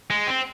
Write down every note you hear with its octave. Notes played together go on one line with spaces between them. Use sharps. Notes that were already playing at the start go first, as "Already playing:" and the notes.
G#3
C4